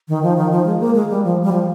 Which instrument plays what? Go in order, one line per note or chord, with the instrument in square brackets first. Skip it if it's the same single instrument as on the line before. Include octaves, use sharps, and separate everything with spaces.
[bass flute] D#3
F3
D#3
F3
G#3
A#3
G#3
G3
F3
G3
F3